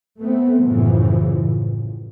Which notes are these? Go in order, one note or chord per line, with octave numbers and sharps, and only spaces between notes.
A3 B3 C4
A#1 F#2 A2 C#3 E3 F3
A1